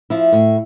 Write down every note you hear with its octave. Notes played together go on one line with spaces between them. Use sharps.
F3 E4
A2